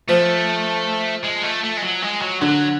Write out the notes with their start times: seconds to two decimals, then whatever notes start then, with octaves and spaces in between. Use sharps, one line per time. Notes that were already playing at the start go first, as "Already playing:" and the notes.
0.09 F3 A3
1.24 G#3
1.44 A3
1.64 A3
1.77 G#3
1.82 F#3
2.02 G#3
2.22 F#3
2.41 D3 F#3